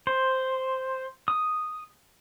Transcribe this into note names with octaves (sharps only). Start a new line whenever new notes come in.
C5
D#6